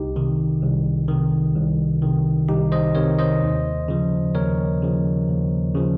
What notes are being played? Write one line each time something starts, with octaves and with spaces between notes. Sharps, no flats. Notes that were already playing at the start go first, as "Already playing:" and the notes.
Already playing: C2 D#4 G4
C3 D#3
C2
C3 D#3
C2
C3 D#3
C2 D#4 G4
C5 D#5
C3 D#3 A#4 C#5
C5 D#5
D#2
C#3 F3
D#2 A#4 C#5
C#3 F3
D#2
C#3 F3